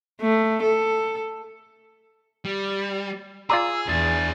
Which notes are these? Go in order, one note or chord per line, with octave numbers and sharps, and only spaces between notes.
A3
A4
G3
F4 G#4 D5 A#5 E6
E2 D4 G#4 A6